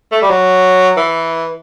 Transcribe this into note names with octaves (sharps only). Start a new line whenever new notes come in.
A3
G3
F#3
E3